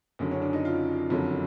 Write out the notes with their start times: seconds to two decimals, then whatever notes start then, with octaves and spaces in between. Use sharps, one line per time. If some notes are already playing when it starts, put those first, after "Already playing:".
0.19 F#1 F#2 D3 F#3
0.31 C#4
0.42 D4
0.53 D#4
0.65 F4
1.10 F#1 F2 D3 F#3